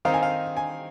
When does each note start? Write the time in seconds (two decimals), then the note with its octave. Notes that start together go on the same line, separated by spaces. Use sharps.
0.05 D#3 C4 D#4 F5
0.14 G#5
0.23 F5
0.57 G#5